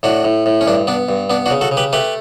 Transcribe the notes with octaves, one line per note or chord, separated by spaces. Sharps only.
A2 D4 F#4
A2
A2
C#4
G2 D4
B3 D4
G2
B3 D4
D4 F#4
C#3
F#4 A4
C#3
G4 B4
A3 G4 B4